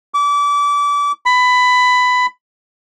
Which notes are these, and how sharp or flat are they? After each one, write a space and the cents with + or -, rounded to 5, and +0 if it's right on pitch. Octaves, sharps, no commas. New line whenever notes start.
D6 -30
B5 +15